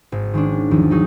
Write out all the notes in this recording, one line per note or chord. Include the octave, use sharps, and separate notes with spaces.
G#1
D#3 G#3 C#4 D4
E2 D#3 F3
F#3 C#4 D#4 G#4